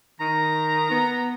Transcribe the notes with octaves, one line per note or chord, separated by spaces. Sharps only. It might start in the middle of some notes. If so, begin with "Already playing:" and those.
D#3 A#5
B3